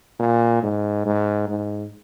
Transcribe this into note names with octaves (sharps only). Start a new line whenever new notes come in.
A#2
G#2
G#2
G#2